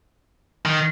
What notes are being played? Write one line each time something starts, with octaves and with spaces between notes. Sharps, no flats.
D#3